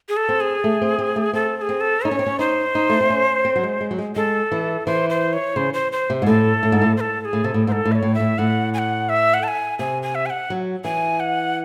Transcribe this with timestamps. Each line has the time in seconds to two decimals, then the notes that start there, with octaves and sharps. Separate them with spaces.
0.09 G#4
0.17 A4
0.29 C4
0.40 G#4
0.64 A3
0.82 C4
0.99 C4
1.16 A3
1.33 C4 A4
1.57 A4
1.61 G#4
1.69 C4
1.81 A4
2.04 D#4 C#5
2.11 C#4
2.19 C4
2.26 C#4
2.39 D#4 C5
2.75 D#4
2.90 A3
3.01 C4
3.10 C#4
3.45 C4
3.56 F#3
3.63 G#3
3.81 G#3
3.91 F#3
3.99 G#3
4.15 G#3 A4
4.52 E3
4.87 E3 C5
5.10 C5
5.33 C#5
5.56 C#3 C5
5.74 C5
5.92 C5
6.10 C3
6.22 G#2
6.26 A2 A4
6.63 A2
6.72 G#2
6.82 A2
6.97 C5
7.01 A4
7.21 A4
7.25 G#4
7.33 A2
7.44 C3 A4
7.54 A2
7.67 G#2 C5
7.72 A4
7.85 A2
7.92 E5
7.95 C#5
8.02 A2
8.15 E5
8.20 A2
8.38 A2 F#5
8.74 G#5
8.78 F#5
9.09 E5
9.34 F#5
9.43 A5
9.48 G#5
9.79 C3 G#5
10.03 G#5
10.15 E5
10.26 G#5
10.30 F#5
10.50 F#3
10.84 E3 G#5
11.20 F#5